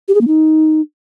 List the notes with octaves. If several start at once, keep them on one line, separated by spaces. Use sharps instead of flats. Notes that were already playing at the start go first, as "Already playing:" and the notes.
G4
G#4
A#3
D#4